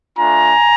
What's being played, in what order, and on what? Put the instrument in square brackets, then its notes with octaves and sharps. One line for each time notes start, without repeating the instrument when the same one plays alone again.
[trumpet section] A3 D4 F4 G#5 A#5